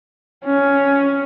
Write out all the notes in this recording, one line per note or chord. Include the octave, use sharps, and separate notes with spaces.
C#4